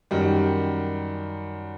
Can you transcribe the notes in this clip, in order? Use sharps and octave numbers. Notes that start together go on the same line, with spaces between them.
F#2 D#3 G3